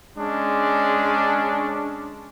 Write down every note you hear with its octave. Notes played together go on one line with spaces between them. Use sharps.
G#3 C#4 D4